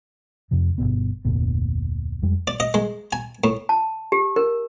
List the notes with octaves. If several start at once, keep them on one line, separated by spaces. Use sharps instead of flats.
F2 C3 F3
G1 F2 B2 B3
F1 D2 A#2 B3
F2 G3 G#3
D5
D#5
G#3
G#5
A2
A5
G4
A#4